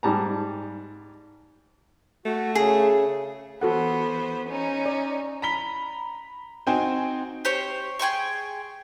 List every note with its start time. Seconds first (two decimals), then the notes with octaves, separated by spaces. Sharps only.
0.03 G#2 G3 A5 A#5
2.25 A3 F#4
2.55 C#3 G#4
3.61 E3 B3 F#4 A4 C5 F#5
4.48 C#4 D#4
4.86 D5
5.42 A#5 B5 B6 G7
6.67 C4 D#4 F#4 C5 G5 G#5
7.45 G4 C5 C#5 C#6
7.99 G#4 G5 C6 C#6